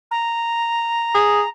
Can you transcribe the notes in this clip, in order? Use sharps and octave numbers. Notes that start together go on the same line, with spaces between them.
A#5
G#4